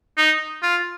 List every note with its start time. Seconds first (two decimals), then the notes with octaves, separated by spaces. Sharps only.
0.17 D#4
0.63 F4